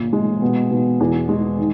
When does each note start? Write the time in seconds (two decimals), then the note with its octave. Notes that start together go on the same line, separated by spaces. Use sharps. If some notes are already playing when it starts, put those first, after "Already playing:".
Already playing: G1 A#2
0.13 G#3
0.42 B2
0.71 B2
1.00 E2
1.29 G#3
1.58 D#3